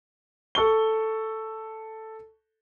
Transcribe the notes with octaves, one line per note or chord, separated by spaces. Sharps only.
A4 C#6 G7